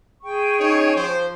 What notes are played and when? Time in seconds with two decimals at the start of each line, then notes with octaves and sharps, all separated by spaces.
0.23 G#4 G5 C#6
0.60 C#4 D#4 C#5
0.96 F3 C5